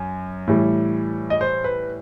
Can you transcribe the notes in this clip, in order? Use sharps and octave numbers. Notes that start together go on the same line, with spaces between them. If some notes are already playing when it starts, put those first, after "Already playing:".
Already playing: F#2
A2 E3 G3
D#5
C5
B4